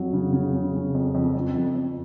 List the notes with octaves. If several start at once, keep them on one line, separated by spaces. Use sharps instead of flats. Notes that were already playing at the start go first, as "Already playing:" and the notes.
Already playing: F2 F#3
C#3
C#3
C#3
C#3
F2
F2
F2
F2
F2